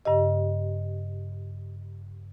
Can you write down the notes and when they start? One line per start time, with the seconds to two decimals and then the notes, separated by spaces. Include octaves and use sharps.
0.05 G2 C#3 G4 D#5